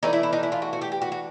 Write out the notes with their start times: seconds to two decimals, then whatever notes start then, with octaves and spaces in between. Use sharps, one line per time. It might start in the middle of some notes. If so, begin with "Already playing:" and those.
0.03 E3 A3 D4 D#4
0.13 E4
0.23 E4
0.33 D#4
0.43 E4
0.52 F4
0.62 F#4
0.73 F#4
0.81 G4
0.92 G4
1.02 F#4
1.12 F#4